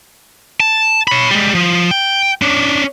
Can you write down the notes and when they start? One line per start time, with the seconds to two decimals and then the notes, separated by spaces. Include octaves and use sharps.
0.60 A5
1.08 C#5 B5
1.31 G3 G#3
1.55 F3
1.91 G5
2.42 C#4 D4